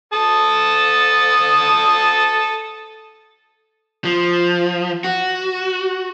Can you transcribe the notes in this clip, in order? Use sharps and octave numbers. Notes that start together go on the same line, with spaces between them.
A4 A5 D#6
F3
F#4